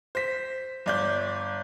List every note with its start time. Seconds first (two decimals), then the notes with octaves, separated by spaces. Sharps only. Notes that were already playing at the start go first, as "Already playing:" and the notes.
0.15 C5 B6
0.86 G1 D5 G6